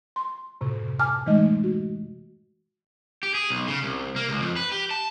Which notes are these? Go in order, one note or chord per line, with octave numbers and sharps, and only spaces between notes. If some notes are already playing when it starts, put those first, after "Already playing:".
C6
F#2 A2 C3
G#5 A5 D6 F6
E3 G#3 A3 D#4 D#5
F#4
G4
G#4
B1
C#3
C2
A#3
C#2
F2
B4
G4
A5